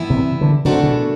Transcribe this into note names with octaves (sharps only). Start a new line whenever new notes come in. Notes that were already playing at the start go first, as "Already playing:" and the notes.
Already playing: G2 E3 B3 E4
C3
D3
F#2 C3 E3 A3 D4 F#4
B2